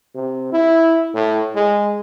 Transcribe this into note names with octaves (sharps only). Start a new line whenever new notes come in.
C3
E4
A2
G#3